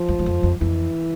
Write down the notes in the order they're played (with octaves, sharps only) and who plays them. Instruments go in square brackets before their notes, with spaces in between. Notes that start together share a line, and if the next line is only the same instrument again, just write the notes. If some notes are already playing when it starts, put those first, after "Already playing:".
Already playing: [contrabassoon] F3
[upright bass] F2
E2
F2
F2
[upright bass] F2 [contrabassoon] E3